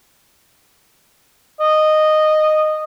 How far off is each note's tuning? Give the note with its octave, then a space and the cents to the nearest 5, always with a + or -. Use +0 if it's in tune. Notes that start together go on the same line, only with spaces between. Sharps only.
D#5 -10